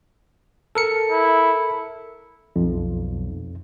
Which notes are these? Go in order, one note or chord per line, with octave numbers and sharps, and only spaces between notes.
A4 A#4 C#7
E4
B1 F2